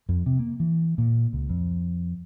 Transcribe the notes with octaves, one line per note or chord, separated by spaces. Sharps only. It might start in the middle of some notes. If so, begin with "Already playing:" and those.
F2
C3
A#3
E3
A#2
C#2
F2